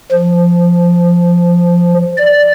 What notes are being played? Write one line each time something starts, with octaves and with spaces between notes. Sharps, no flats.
F3
D5